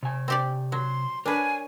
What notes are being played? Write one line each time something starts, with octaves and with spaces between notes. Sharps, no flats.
C3 G#5
C4 G4 D5
F#3 C6
D4 A#4 B4 C#5 G#5